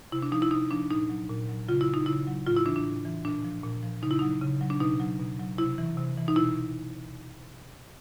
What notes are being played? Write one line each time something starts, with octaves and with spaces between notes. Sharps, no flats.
C3 E4
D4
F3 D#4
E4
C3 D#4
F3 D4
A#2 D#4
F#3
A#2
F#3
C#3 F4
E4
F#3
D#4
C#3 E4
F#3
A2 F4
E4
E3 D4
D4
A2
E3
A#2 D4
F3
A#2
F3
C#3 D#4
E4
F#3 D#4
C#3
F#3
D4
B2 D#4
F#3
B2
F#3
C3 E4
E3
C3
E3
D#4
B2 E4